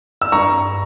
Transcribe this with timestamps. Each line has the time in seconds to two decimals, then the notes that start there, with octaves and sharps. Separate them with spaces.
0.22 E6
0.32 G2 A#5 C#6